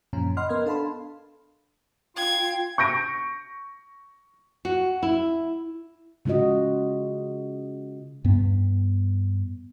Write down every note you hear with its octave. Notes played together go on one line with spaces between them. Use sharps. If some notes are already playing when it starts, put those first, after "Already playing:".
F#2 A#2 C#3 F3 C#4 A#5
D#5 F#5 B5 C6 F6
B3 A#4 D#5 F6 G#6
D4 A4 F5 A5 B5 C6
F4 F5 G5 G#6
C#6 G6 A#6 D7
F#4
E4
C#3 G#3 F4 F#4 D#5
G2 B3